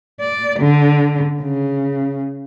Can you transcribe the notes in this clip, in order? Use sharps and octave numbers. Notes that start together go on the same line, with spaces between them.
D5
D3
C#3